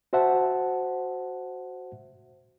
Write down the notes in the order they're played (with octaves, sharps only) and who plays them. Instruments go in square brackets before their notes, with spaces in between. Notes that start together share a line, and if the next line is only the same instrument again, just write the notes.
[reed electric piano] F#4 C5 E5 F#5 A5